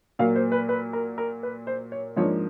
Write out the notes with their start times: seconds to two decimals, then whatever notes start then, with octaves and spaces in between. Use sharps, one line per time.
0.19 A#2 F#3 A#3 F5
0.36 C5
0.52 B4
0.69 B4
0.93 A#4
1.18 A#4
1.43 B4
1.67 C5
1.92 C#5
2.16 G#2 F3 A#3 D4 C#5